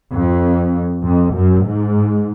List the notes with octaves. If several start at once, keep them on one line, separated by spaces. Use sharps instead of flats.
F2
F2
F#2
G#2